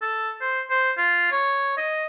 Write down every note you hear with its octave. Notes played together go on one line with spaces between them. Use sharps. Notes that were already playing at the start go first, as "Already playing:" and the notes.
A4
C5
C5
F4
C#5
D#5